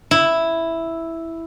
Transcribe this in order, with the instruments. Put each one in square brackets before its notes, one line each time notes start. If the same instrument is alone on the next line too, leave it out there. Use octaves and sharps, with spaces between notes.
[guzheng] E4